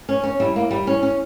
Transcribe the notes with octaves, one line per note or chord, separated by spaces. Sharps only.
C#4
C#4
G3 E4
A#3
G3
C#4
C#4